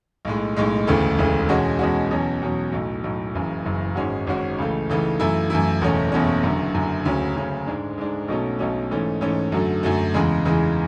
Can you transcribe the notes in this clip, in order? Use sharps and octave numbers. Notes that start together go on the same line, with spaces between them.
B1 A2 G#3
B1 A2 G#3
E1 D2 C#3 E3 A3
E1 D2 C#3 E3 A3
E2 B2 G#3 C#4 F#4
E2 B2 G#3 C#4 F#4
E2 B2 F#3 C#4
E2 B2 F#3 C#4
B1 A2 F#3
B1 A2 F#3
F#1 F#2 C#3 E3
F#1 F#2 C#3 E3
G#1 G#2 G#3 C#4 F#4
G#1 G#2 G#3 C#4 F#4
C#2 C#3 E3 A3
C#2 C#3 E3 A3
F#2 E3 A3 E4
F#2 E3 A3 E4
F#1 E2 B2 A3 C#4
F#1 E2 B2 A3 C#4
F#1 F#2 D3
F#1 F#2 D3
D2 C#3 F#3 C#4
D2 C#3 F#3 C#4
G#2 G#3 D4
G#2 G#3 D4
B1 B2 F#3 A3 C#4
B1 B2 F#3 A3 C#4
G#2 E3 A3 C#4
G#2 E3 A3 C#4
F#2 D3 F#3 A3
F#2 D3 F#3 A3
E2 C#3 E3 G#3
E2 C#3 E3 G#3